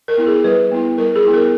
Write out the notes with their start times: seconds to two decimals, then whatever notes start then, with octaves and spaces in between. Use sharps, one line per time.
0.08 A#4
0.17 B3 E4
0.27 G#4
0.44 G3 B4
0.71 B3 E4
0.98 G3 A#4
1.16 G#4
1.25 B3 E4
1.33 A#4